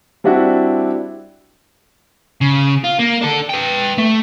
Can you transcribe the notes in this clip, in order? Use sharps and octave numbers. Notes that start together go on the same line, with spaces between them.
G3 C4 D4 E4 F#4
C#3
F4
A#3
D4 A4
B4 G5
A3